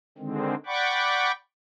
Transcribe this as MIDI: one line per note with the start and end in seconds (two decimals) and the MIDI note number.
0.18 0.55 50
0.18 0.55 51
0.18 0.55 56
0.18 0.55 60
0.66 1.32 74
0.66 1.32 78
0.66 1.32 79
0.66 1.32 83
0.66 1.32 85
0.66 1.32 86